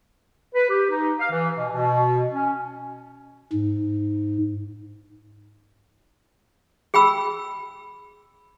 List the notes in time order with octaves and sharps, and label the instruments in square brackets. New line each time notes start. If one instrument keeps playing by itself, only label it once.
[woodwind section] B4
G4
D#4
F5
E3
B2
B2
C#4
[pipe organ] G#2
[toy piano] G#4 G5 B5 E6